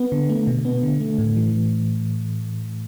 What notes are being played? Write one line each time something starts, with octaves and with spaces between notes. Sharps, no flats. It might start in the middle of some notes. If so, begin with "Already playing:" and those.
Already playing: B3
D3
A3
B2
B3
D3
A3
A2
E3